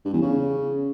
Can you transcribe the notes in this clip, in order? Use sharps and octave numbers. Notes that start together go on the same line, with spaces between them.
G2
E2
C#3